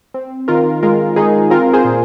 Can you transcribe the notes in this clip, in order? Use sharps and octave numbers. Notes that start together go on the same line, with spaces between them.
C4
D#3 F4 A#4
G#3 F4 A#4
D#3 D#4 G#4
C4 F4 A#4
G#4 C5
A#2